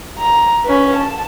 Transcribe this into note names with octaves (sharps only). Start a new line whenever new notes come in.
A#5
C#4 B4
A5